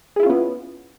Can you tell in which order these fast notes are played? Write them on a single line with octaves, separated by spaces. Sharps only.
G#4 E4 F4 C#4 B3